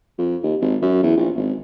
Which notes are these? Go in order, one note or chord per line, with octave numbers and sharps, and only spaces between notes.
F2
D#2
G#1
F#2
E2
A#1
G#1